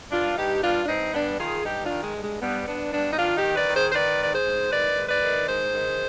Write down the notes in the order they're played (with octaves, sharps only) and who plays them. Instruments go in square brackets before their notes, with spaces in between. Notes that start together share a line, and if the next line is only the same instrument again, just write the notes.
[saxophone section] G2 D4 F4
G2 D#4 G4
G2 D4 F4
D4
G2 C4 D#4
G2 B3 D4
D#3 F4 G#4
G2 D#4 G4
D4 F4
D#3
G#3
G2
G#3
G2 G3 B3
G2 B3 D4
G2 B3 D4
D#4
D#3 D4 F4
D#4 G4
D#3
B4 D5
D#3
G#4 C5
C5
D#3 B4 D5
G#2 D5
G#4 C5
G#2
D#3 B4 D5
G#2
B4 D5
D#3
G#2 G#4 C5
D#3